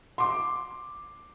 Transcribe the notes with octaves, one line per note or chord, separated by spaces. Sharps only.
C6 D6